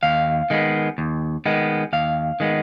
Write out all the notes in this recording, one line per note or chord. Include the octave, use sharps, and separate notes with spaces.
D#2 F5
D#3 G#3 B3
D#2
D#3 G#3 B3
D#2 F5
D#3 G#3 B3